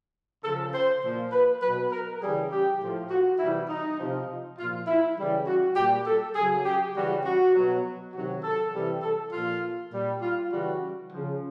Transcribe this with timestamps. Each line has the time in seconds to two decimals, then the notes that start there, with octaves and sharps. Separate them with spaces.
0.43 C#3 F3 A4
0.73 C5
1.02 A#2 F3
1.32 B4
1.61 B2 F#3 B4
1.91 A#4
2.21 C#3 E3 G3 G#4
2.51 G4
2.80 A2 F3
3.10 F#4
3.39 C3 E3 G3 E4
3.69 D#4
3.99 C3 F3
4.58 A#2 F3 F4
4.87 E4
5.17 C#3 E3 G3
5.47 F#4
5.76 A#2 G3 G4
6.06 A4
6.36 C#3 F#3 G#4
6.66 G4
6.95 C#3 E3 G3 F#4
7.25 F#4
7.54 B2 F#3
8.13 C3 D#3 F#3 F#4
8.43 A4
8.73 C3 E3 G3
9.03 A4
9.32 A#2 F3 F4
9.91 A#2 G3
10.21 F4
10.50 C#3 E3 G3 F#4
11.10 C#3 F3